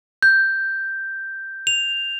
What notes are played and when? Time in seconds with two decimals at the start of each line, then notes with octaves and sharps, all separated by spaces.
0.23 G6
1.67 F7